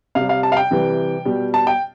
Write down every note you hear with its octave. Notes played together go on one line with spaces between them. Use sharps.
C3 G3 F5
F5
A5
F5
G5
C3 E3 G3
B2 G3
A5
G5